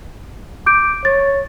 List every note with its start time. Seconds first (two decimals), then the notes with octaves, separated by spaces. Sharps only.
0.66 D6 G6 D7
1.05 C#5 A6